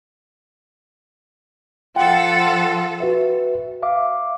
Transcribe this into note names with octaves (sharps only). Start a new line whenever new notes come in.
F3 F4 A4 F#5 G5
F#4 B4 E5
E5 F5 D6